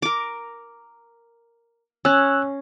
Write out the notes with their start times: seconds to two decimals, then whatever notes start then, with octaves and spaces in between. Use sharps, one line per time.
0.02 A#4 D6
2.05 C#4 E6 F#6